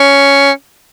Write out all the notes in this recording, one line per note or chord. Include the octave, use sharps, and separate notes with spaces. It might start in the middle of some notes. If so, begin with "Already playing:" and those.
Already playing: C#4